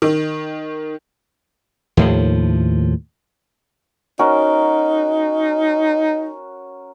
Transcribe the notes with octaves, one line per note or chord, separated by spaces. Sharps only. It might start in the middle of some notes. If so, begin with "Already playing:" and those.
D#3
D#2 A2 F3
C#4 D#4 F#4 A#4